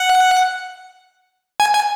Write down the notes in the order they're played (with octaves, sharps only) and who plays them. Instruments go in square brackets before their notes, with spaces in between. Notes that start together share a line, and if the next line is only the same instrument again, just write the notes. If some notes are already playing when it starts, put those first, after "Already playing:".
Already playing: [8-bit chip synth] F#5
G#5
G#5